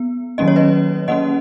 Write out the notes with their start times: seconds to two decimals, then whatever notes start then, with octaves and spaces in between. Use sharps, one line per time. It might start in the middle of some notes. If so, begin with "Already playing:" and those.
Already playing: B3
0.38 D#3 F#3 A#3 C#4 D#5
0.48 C#5
0.56 B4 D#5
1.08 D#3 A#3 C#4 D#5 F#5